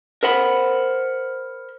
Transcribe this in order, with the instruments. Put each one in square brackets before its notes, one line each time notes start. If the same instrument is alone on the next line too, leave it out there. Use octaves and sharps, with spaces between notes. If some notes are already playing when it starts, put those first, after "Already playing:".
[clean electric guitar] A#4 C5 F#5 B5